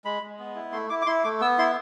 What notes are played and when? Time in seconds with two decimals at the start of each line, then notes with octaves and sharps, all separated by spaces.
0.05 G#3 B5
0.22 G#3
0.39 B3
0.55 E4
0.72 A3 C6
0.90 E4 D6
1.02 D6
1.06 E4 C6
1.24 A3 D6
1.41 B3 E6
1.58 E4 C6